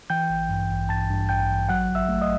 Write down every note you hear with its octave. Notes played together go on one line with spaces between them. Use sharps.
E3 G5 G6
A1
G2
A1
G2 A5 A6
G2
A1 G5 G6
A1
F#3 F#5 F#6
G1
E5 E6
A3
D#5 D#6